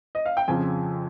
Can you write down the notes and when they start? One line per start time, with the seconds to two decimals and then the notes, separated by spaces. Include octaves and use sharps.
0.15 D#5
0.26 F5
0.37 G5
0.48 F2 C#3 F3 G#5